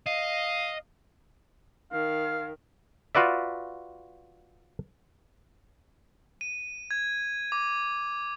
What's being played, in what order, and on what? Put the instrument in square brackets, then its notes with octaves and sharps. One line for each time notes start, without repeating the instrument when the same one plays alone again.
[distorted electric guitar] D#5 [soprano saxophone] F5
[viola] D#3 [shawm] F5
[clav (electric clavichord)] F4 F#4 B4 D5 E5
[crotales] D#7
G#6
D6